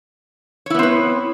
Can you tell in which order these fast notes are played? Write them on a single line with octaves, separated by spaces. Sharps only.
C#5 E4 B3 C4 B4